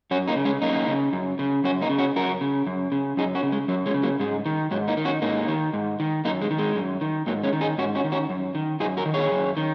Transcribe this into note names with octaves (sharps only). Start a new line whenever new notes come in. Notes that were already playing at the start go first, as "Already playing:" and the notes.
F#2 C#4 F#4
A#3 D#4
C#3
G#3 C#4
F#2 A#3 D#4
C#3
F#2
C#3
F#2 C#4 F#4
A#3 D#4
C#3
C#4 F#4
F#2 F#4 A#4
C#3
F#2
C#3
F#2 D#4 G#4
C#4 F#4
C#3
G#3
F#2 F#3
G#3 C#4
C#3
F#3 A#3
G#2 G#3
D#3
G#2 F#3
A#3 D#4
D#3
C#4 F#4
G#2 A#3 D#4
D#3
G#2
D#3
F#2 A#3 D#4
G#3
D#3
G#3
F#2
D#3
G#2 F#3 A#3
G#3 C#4
D#3
D#4 G#4
G#2 C#4 F#4
C#4 F#4
D#3
C#4 F#4
F#2
D#3
F#2 D#4 G#4
F#4 A#4
D#3
G#4 C#5
F#2
D#3